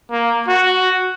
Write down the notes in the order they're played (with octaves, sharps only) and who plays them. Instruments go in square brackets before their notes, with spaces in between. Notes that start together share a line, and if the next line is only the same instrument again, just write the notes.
[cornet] A#3
F#4